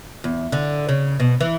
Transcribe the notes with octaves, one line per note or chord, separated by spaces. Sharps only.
E2
D3
C#3
B2
E3